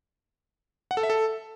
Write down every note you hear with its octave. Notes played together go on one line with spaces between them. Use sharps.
F#5
A4
E5
A4